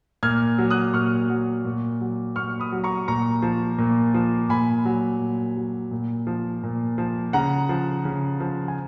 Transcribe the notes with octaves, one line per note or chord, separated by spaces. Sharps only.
A#2 F6 G#6
F#3
D#6 F#6
A#2 C#6 F6
F#3
A#2
F#3
A#2 C#6 F6
B5 D#6
F#3
A#5 C#6
A#2 A#5 C#6
F3
A#2
F3
A#2 G#5 B5
F#3
A#2
F#3
A#2
F3
A#2
F3
C#3 F#5 A#5
F3
C#3
F3
G#5